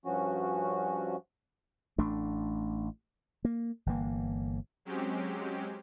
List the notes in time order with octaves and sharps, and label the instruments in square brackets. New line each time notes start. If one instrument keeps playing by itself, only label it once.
[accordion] G2 F3 C#4 F#4
[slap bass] A1 A3 D4
A#3
G1 E3 A#3
[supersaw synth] F#3 G#3 C4 C#4 G4